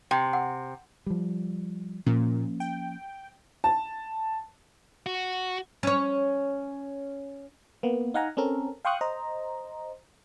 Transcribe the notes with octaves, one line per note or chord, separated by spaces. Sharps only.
C3 G5
F#5
F3 G3
A#2 F3 A#3 C#4
G5
A5
F#4
C#4 C#5
A#3 B3
D#4 F5 F#5 G#5 A#5
C4 C#4 A4 A#4
F5 G5 C6 C#6 D#6 F#6
C5 D#5 A#5